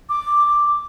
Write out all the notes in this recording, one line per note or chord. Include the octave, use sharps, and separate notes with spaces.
D6